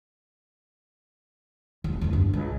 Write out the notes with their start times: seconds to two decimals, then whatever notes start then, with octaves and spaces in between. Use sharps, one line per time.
1.84 D#1 E4
2.01 D#1 F2
2.13 G2 B3
2.33 C#2